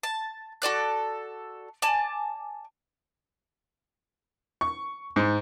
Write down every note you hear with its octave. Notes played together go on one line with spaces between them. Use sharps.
A5
F#4 A4 D5 F#6
D5 G#5 A5
C#6
G#2